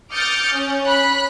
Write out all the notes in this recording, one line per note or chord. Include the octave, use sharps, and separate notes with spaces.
D6 D#6 F6 G6 A6 C#7
C#4
B5 F#6 B6